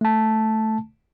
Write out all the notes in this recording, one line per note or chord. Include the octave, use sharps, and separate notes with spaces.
A3 A5